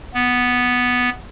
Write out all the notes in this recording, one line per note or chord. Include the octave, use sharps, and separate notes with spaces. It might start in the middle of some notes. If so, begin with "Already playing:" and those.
B3